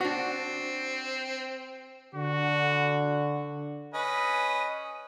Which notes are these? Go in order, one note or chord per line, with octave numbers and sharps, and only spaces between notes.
C4 D4 F#4
D3 F#4
C#4 B4 D#5